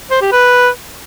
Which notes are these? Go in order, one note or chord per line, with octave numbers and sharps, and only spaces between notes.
C5
G4
B4